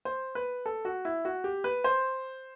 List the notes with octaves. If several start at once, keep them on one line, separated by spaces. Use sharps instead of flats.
C5
B4
A4
F#4
E4
F#4
G4
B4
C5